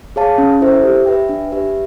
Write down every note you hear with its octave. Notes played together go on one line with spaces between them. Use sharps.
G#4 C#5 F5 A5
C#4
E4 A4 C5 E5
G4
B4 E5 G5
D4
G4 B4 E5